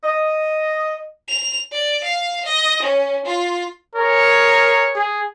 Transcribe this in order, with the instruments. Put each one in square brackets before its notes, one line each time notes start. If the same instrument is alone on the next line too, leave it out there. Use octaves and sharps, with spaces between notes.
[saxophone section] D#5
[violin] F7
D5
F5
D#5
C#4
F4
[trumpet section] G#4 C#5 [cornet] A#4
[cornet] G#4